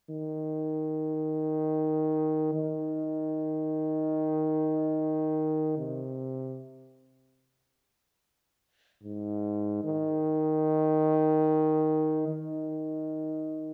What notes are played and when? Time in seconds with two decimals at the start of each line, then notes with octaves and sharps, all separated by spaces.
0.10 D#3
2.54 D#3
5.78 C3
9.03 G#2
9.84 D#3
12.28 D#3